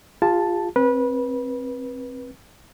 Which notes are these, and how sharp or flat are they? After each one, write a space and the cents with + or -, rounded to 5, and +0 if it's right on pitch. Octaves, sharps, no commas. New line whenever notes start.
F4 +0 G#4 -45 A5 +0
C4 +20 B4 -25